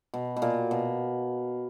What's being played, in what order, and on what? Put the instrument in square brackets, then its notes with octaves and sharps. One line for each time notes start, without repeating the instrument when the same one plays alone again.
[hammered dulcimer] B2
B2
A#2
B2